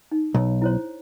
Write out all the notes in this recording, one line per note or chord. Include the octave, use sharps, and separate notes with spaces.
D#4
B1 C#5
E4 C5 C#5